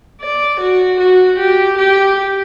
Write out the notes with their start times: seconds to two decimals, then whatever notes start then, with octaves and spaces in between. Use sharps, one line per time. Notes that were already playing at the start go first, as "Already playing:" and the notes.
0.21 D5
0.60 F#4
1.00 F#4
1.39 G4
1.78 G4